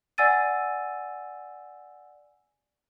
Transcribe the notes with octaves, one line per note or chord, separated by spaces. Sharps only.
D5 F#5 G#5 E6 A6 D#7